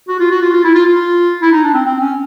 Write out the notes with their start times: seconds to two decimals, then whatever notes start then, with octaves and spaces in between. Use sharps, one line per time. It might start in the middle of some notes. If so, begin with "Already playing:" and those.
0.08 F#4
0.20 F4
0.31 F#4
0.41 F4
0.53 F4
0.64 E4
0.75 F4
0.86 F4
1.42 E4
1.52 D#4
1.64 D4
1.74 C4
1.85 C4
2.00 C#4